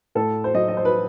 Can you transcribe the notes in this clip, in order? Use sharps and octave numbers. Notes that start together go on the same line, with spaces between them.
A2 A4
C5
F#3 D#5
D#5
C5
B4